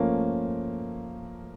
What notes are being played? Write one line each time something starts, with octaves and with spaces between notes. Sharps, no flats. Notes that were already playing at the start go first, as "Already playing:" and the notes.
Already playing: F3 A3 A#3 C#4